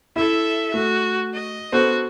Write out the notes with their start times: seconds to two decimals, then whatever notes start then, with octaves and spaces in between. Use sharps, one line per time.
0.16 E4 A4 E5
0.74 A3 F#4
1.34 D#5
1.72 B3 F#4 A4 C5